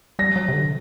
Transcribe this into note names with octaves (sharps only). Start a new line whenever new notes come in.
G3 A#6
F#3
C3
D3